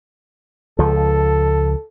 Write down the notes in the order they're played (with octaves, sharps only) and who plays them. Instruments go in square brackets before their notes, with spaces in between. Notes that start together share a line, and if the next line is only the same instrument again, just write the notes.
[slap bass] C#2 F3 [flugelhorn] A4